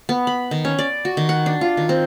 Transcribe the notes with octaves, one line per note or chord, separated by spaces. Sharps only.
B3
B5
D#3
C#4
D5
F#4
D#3
F#5
D4
F4
D#3
C4